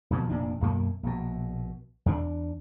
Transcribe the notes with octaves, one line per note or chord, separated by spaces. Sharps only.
D#1 B2 F3
F1 A#2 D4
B1 F#2 A#3
A#1 B2
E2 D4